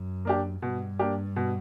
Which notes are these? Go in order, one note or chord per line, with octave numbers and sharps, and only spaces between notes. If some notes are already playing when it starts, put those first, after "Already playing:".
Already playing: F#2
A#3 D4 G4
G2 B2
A#3 D4 G4
B2